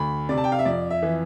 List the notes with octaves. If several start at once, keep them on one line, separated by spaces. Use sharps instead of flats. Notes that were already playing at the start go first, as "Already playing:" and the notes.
Already playing: D2 B5
C3 D5
A5
G5
F5
E5
F2 D5
E5
E3